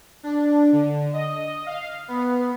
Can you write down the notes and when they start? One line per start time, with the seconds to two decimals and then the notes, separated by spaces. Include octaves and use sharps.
0.23 D4
0.72 D3
1.13 D#5
1.66 F5
2.08 B3